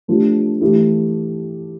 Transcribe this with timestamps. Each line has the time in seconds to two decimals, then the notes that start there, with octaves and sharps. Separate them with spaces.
0.08 F3 A3 D4 G4
0.61 E3 A3 E4 G4